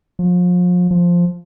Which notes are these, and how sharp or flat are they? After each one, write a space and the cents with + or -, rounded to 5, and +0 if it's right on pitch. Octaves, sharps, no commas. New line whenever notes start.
F3 +35
F3 +0